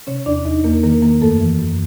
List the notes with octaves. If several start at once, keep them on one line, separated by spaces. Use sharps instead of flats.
C3 C#4 C#5
E2 D4 D5
E2 D#4 D#5
E2 A#3 A#4
D#3 A#3 A#4
D#3 A#3 A#4
F#2 A3 A4
E3
F#2